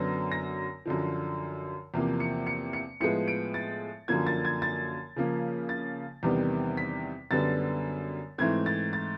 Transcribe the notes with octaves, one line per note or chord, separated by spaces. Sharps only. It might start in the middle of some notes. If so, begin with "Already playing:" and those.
Already playing: F#2 D3 F#3 B3 A#6
A#6
F#2 D3 F3
E2 C3 F3 A#3
C#7
C#7
C#7
A2 F3 G#3 B3 C#7
D7
A6
F#2 D3 F3 A#3 G#6
A6
G#6
A6
C#3 F3 A#3
A6
E2 C3 D#3 G3 B3
B6
F#2 D3 G3 B3 A6
G#2 E3 A3 C4 G#6
A6
A6